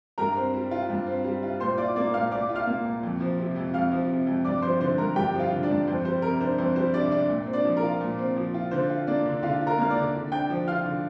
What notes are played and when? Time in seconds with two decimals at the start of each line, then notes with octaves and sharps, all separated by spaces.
0.18 G2 A#4 A#5
0.36 C4
0.54 G3
0.71 F4
0.90 G2
1.07 C4
1.25 G3
1.43 F4
1.60 A#2 C5 C6
1.78 F4 D5 D6
1.96 A#3 D5 D6
2.14 A#2 F5 F6
2.32 A#2 D5 D6
2.49 F4
2.55 F5 F6
2.67 A#3
2.85 A#2
3.03 F2
3.20 F3
3.39 C3
3.56 F2
3.74 F2 F5 F6
3.91 F3
4.09 C3
4.27 F2
4.45 G2 D5 D6
4.62 F3 C5 C6
4.81 D3 C5 C6
4.98 G2 A#4 A#5
5.16 G2 G4 G5
5.34 F3
5.40 F4 F5
5.52 D3
5.63 D4 D5
5.69 G2
5.87 F2 C5
6.05 G3 C5
6.22 C3 A#4
6.40 D4 C5
6.58 F2 C5
6.76 G3 C5
6.94 C3 D4 D5
7.11 D4 D5
7.29 A#2
7.47 C4
7.53 D4 D5
7.65 F3
7.77 A#4
7.83 F4
8.01 A#2
8.19 C4
8.36 F3
8.54 F4
8.71 D3 C5
8.90 F4
9.07 A#3 D4 D5
9.25 D3
9.42 D3 F4 F5
9.61 F4
9.67 A#4 A#5
9.78 A#3 F6
9.90 D5 D6
9.96 D3
10.14 D3
10.32 D4 G5 G6
10.50 F3
10.68 F4 F5 F6
10.85 D3